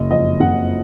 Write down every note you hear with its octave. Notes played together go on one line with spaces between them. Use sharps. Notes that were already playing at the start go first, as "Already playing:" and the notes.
Already playing: F#1 D#5
F2 D#5
F#1 F#5